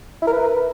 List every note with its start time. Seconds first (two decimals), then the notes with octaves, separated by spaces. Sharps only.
0.22 E4
0.27 A#4
0.33 B4